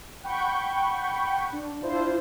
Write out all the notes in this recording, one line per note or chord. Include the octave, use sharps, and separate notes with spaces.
F#5 G5 B5 C#6 G6
D4
D4 E4 F4 C5